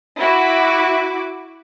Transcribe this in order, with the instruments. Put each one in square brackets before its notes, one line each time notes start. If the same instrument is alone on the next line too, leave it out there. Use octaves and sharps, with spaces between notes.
[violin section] E4 F#4 D6